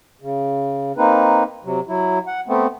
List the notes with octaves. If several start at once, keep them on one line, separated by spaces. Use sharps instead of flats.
C#3
A#3 C4 D#4 B4
C3 F#3
F#3 E4
F#5
A3 B3 C4